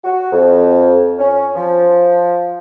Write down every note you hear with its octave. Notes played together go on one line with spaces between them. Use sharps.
F#4
F2
C#4
F3